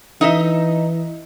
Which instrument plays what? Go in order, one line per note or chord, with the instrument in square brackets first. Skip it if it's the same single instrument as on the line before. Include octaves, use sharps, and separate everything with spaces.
[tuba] E3 [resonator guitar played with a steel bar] D#4 D#5 E5